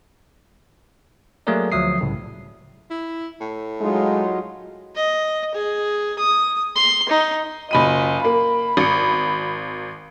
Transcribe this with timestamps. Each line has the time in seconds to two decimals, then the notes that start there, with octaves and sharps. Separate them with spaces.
1.47 F#3 A3 A#3 G#4 A#4 D5
1.72 D2 F3 F#3 E5 D#6 C7
2.01 C2 A2 C#3
2.90 E4
3.40 A2
3.81 F#3 G#3 D#4 F4
4.95 D#5
5.55 G#4
6.19 D#6
6.76 C6
7.09 D#4
7.71 F#1 F4 D#5 B5 D#7
8.25 A#3 B5
8.77 G#1 C#7